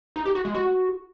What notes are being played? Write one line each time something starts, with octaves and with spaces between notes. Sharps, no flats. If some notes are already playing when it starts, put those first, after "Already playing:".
D#4
G4
F#4
G#3
F#4